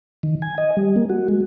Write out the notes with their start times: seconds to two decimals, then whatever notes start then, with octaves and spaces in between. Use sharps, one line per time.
0.23 D#3
0.42 G#5
0.58 D#5
0.77 G3
0.96 A#3
1.10 F#4
1.28 G#3